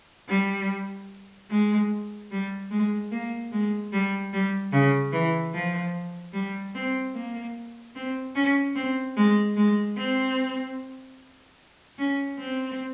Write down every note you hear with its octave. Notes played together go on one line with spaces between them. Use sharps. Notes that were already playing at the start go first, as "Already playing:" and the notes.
G3
G#3
G3
G#3
A#3
G#3
G3
G3
C#3
E3
F3
G3
C4
A#3
C4
C#4
C4
G#3
G#3
C4
C#4
C4